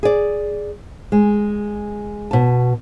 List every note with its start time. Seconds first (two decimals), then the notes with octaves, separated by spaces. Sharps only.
0.03 G#4 D5
1.12 G#3
2.31 B2 A5